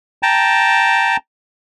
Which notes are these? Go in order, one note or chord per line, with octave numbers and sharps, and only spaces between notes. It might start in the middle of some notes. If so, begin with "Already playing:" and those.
G5 A5 A#5